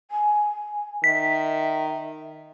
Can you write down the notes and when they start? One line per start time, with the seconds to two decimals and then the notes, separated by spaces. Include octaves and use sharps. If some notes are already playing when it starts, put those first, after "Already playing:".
0.11 G#5
1.04 D#3 E5 B6